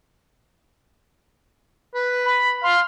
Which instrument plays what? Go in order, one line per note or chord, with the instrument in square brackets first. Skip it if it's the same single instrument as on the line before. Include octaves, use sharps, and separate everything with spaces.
[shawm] B4
[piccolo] B5
[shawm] F5 [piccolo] C6